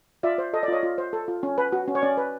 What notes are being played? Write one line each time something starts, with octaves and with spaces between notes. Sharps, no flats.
F4 D5 E5
C5
A4 D#5
D5
F4 C#5 D#5
F4
C5
A4
F4
C#4
B4
F#4
C#4
C#5
C#4 D5
B4